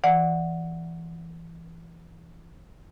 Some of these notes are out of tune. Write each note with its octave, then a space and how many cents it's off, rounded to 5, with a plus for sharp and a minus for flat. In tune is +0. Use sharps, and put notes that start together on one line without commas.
E3 +15 D5 +0 F#5 -10